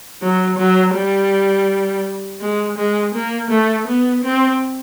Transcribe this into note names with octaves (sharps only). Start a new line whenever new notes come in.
F#3
F#3
G3
G#3
G#3
A#3
A3
B3
C4